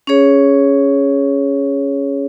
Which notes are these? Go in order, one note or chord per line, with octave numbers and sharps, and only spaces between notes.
C#4 G#4 C#5